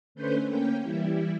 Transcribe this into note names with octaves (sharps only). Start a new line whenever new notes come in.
D3 A3 C#4 B4 C5 G6
A#3 C#4 G5
E3 G3 E4